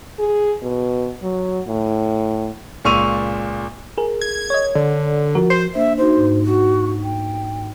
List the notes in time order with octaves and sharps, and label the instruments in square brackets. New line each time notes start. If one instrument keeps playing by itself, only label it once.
[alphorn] G#4
B2
F#3
A2
[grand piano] C#2 A#2 C#6 E6 D#7 F7
[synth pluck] G#4 A#4
[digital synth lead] G#6
[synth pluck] C#5 D#5
[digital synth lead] D3
[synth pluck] F3 F#4 A#4
[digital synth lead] C5
[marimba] A#3 D4 C5 [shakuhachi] E5
[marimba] D#4 F#4 [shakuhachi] C5
[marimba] G#2
[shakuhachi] F#4
G5